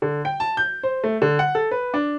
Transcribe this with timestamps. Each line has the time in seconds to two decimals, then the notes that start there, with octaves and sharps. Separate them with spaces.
0.02 D3
0.25 G5
0.40 A5
0.57 G6
0.83 C5
1.04 A3
1.22 D3
1.39 F#5
1.55 A4
1.71 B4
1.94 D4